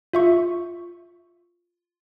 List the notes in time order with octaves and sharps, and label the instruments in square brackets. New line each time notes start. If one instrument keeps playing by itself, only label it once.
[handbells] F4 E5 C#6